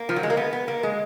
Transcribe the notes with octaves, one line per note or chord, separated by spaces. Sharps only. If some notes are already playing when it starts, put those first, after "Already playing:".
Already playing: A#3
F3
F#3
G#3
A#3
B3
B3
A#3
G#3